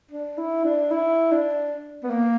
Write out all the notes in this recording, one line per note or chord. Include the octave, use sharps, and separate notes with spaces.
D4
E4
D4
E4
D4
B3
A#3